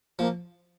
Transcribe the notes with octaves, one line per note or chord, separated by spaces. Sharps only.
F3 A#3